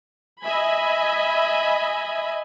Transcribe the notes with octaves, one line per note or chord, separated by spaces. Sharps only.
D#5 E5 G#5 B5